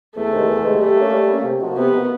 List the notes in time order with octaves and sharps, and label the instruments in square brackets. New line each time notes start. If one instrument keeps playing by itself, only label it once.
[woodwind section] E2 [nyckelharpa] A3
[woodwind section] C3 D#3 G#3
E2
C3 D#3 G#3
[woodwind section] G3 [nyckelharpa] A3
[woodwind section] A#3 C#4
G3
A#3 C#4
C3
F3 A#3 D#4 F#4
[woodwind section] C3 [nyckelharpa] B3
[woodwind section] F3 A#3 D#4 F#4